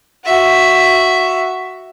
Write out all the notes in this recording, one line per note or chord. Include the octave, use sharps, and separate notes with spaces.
F#4 E5